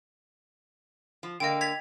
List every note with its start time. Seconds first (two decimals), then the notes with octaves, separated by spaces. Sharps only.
1.23 F3
1.40 D3 A#3 D#5 G5
1.61 G#6 B6 F7